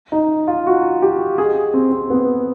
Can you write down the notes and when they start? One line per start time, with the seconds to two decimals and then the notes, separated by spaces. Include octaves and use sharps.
0.12 D#4
0.48 F4
0.67 F#4
1.02 G4
1.38 G#4
1.74 C4
1.92 C4
2.10 B3